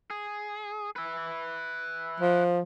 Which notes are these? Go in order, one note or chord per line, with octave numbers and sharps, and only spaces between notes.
G#4
B4 E5
F3